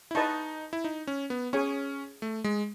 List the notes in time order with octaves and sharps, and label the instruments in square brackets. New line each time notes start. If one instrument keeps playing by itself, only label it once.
[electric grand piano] E4
[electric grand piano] D#4 [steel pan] B4 D#5 A5 C#6
[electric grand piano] E4
D#4
C#4
B3
[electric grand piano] C#4 [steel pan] G#4 C#5 G#5 C#6
[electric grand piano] A3
G#3